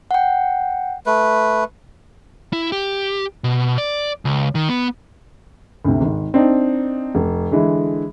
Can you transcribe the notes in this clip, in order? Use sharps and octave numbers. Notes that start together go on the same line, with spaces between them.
F#5 G5
A3 B4
E4
G4
B2
D5
C#2
D#3
B3
D2 C3
G#1
C4 D4 D#4
F1
D3 E3 G#3